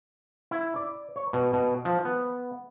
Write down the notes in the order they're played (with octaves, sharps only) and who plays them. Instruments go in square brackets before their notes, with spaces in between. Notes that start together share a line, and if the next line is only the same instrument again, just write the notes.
[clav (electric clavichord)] E4
D5
C#5
B2
B2
F3
B3